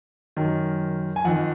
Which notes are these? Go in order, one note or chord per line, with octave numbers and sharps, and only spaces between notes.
F#2 D#3
G#5
F2 D#3 F#5